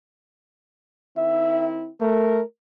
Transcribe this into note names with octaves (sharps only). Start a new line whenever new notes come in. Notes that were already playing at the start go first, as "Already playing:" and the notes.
D#3 C4 E4 E5
A3 A#4